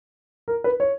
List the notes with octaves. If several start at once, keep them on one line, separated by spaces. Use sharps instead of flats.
A#4
B4
C#5